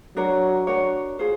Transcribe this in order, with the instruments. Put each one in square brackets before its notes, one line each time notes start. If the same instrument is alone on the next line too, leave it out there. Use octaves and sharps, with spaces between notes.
[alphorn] F#3 [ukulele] D4 F#4 A#4 C#5
[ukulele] D4 F#4 A#4 C#5
F4 G#4 C5